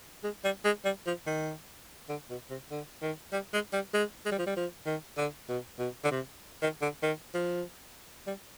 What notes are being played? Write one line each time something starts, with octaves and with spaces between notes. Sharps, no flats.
G#3
G3
G#3
G3
F3
D#3
D3
B2
C3
D3
D#3
G3
G#3
G3
G#3
G#3
G3
F3
G3
F3
D#3
D3
B2
B2
D3
C3
D#3
D3
D#3
F3
G3